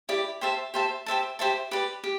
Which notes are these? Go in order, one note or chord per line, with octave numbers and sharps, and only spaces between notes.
E4 G4 D5
G4 C5 E5 A5
G4 C5 E5 A5
G4 C5 E5 A5
G4 C5 E5 A5
G4 B4 D5
G4